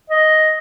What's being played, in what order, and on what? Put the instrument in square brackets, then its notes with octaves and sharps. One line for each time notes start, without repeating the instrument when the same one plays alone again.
[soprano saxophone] D#5